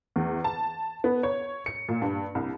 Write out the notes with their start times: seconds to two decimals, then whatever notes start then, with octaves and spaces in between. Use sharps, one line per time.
0.16 E2
0.44 A5
1.04 B3
1.23 C#5
1.66 C#7
1.89 A#2
2.02 G2
2.35 C2